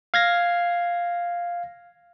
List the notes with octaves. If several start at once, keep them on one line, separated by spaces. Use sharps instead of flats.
F5 G#6 A#6